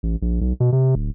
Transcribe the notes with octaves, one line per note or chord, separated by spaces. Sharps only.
A1
A#1
B1
B2
C3
D1